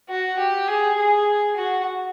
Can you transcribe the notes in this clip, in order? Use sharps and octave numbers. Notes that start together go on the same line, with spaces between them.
F#4
G4
G#4
G#4
F#4